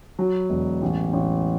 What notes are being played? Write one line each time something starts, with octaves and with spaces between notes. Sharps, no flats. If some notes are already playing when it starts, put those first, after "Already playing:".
F#3
E1
A1
A1